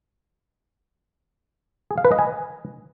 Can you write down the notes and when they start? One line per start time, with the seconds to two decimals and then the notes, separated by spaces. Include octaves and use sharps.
1.91 G#4
1.98 F5
2.05 B4
2.12 D#5
2.19 G#5